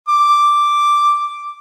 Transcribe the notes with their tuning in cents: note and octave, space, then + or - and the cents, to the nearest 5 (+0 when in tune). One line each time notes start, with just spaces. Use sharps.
D6 +0